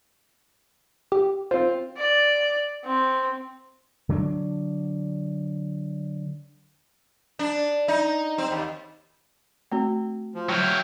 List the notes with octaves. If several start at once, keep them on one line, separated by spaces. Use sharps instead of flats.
G4
C4 F4 C5
D5
C4
D3 F#3 B3 D4
D4
D#4
C4
D#2
A3 C4 F#4
F3
F#3 E4 G5 F6